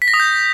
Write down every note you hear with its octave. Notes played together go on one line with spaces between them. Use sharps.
B6
A#6
D#6
G6